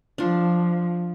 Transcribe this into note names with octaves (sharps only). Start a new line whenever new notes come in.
F3 D4 F4